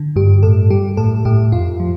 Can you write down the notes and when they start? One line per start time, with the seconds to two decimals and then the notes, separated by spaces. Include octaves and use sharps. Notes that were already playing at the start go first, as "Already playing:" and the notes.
Already playing: D3
0.16 G2 G4
0.43 A2 A4
0.70 G3 G4
0.97 A2 A4
1.25 A2 G4
1.52 F2 F4
1.80 F3